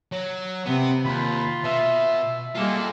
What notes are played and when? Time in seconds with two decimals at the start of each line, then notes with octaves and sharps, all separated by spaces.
0.12 F#3
0.67 C3 B3
1.05 D#2 F4 B5
1.64 B2 E5
2.55 G3 G#3 A#3 F4 A4